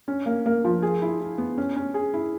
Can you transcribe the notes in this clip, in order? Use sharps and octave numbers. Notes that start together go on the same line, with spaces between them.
C#4
A#3
A#3
F3
G#4
E4
E4
B3
C#4
C#4
G#4
E4